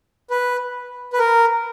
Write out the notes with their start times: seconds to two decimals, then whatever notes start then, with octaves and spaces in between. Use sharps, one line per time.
0.30 B4
1.13 B4
1.19 A#4